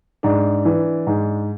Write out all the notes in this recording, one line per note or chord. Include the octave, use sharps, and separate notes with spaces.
G#2 D4
E3
G#2